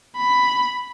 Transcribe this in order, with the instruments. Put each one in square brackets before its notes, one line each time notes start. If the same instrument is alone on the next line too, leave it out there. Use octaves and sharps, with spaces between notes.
[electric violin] B5